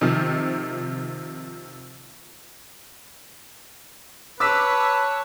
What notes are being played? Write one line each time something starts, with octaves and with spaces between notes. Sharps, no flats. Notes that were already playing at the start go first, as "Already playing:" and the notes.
C3 D#3 F3
B4 C#5 A5 D6 E6 B6